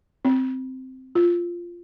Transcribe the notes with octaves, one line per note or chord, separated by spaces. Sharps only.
C4
F4